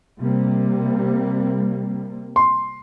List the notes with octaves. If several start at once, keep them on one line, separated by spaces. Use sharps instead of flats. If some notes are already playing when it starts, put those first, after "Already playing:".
C3 G3 A#3
C6